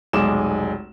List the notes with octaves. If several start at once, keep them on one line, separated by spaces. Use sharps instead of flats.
F1 B1 G#3 D6 E7